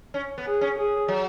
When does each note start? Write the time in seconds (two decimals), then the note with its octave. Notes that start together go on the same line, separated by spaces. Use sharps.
0.14 C#4
0.38 B3
0.45 G#4
0.61 C#4
0.77 G#4
1.08 F#3